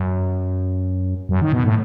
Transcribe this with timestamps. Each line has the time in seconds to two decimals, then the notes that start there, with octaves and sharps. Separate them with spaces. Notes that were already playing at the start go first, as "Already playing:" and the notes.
Already playing: F#2
1.29 F#2
1.41 D#3
1.52 B2
1.65 A2